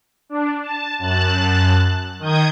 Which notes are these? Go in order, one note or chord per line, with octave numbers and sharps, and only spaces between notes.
D4
A5
F#2 A5 F#6
D#3 D#6 G6 G#6